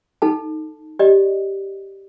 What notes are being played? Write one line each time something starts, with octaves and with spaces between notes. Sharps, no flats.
D#4 A4 A5
G4 D5 D#5